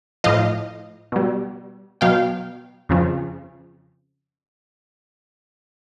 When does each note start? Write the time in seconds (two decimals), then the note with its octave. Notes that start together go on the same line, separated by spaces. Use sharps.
0.24 A2 F3 D#5 F5
1.12 B2 G3
2.01 B2 F#3 F5 G5
2.89 F2 C#3 F3